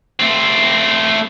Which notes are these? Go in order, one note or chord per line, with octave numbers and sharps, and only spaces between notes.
A3 C4